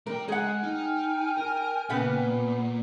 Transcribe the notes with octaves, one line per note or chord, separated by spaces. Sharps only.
G3 A#4 G5
G#3 G#4 F#5
D#4 G5 G#5 F6
A#4
A#2 C#3 B3 B4